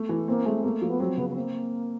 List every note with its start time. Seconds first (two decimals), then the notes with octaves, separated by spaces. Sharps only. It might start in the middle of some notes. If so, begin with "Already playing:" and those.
Already playing: A3
0.09 E3
0.28 A#3 C4
0.45 G#3 A3
0.64 A3 A#3
0.82 F3
0.89 B3
1.00 F#3 C4
1.17 C#3 B3
1.30 B3
1.35 A#3 C4